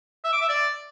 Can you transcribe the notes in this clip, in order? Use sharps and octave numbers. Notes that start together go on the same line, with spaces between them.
E5
D6
E5
D5